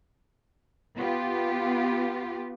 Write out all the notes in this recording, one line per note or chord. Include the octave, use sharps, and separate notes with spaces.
B3 F4 G4